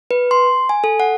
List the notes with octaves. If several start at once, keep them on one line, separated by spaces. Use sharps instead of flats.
B4
C6
G#5
A4
F#5